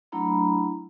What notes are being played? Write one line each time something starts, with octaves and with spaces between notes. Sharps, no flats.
F#3 A3 D4 E4 A#5 B5